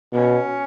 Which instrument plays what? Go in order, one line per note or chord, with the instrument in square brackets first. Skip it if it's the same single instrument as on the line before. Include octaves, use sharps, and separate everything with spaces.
[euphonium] B2 [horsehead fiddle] C#4